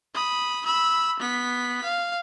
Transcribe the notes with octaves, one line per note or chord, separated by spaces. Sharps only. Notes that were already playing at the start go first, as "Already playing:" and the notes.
B5 D#6
B5 E6
B3 B6
F5